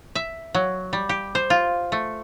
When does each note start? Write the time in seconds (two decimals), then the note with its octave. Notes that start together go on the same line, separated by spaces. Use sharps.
0.15 E5
0.54 F#3
0.93 G3
1.09 G4
1.35 C5
1.50 F4
1.92 A3